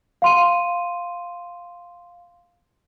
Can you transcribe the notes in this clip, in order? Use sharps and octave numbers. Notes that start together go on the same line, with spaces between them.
F5 C6 D#7